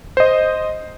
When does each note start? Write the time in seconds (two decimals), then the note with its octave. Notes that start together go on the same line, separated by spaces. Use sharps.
0.17 C5 D#5